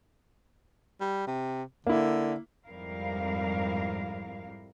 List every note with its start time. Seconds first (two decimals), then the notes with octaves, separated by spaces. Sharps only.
1.01 G3
1.27 C3
1.87 D3 A#3 E4
2.66 F2 G#2 G3 E4 A#4 F5